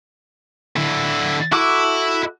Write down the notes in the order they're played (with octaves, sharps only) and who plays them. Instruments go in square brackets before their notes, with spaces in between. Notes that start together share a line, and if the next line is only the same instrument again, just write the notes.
[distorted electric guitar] D3 E4
[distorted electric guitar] E4 [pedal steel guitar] F#4 A4 D6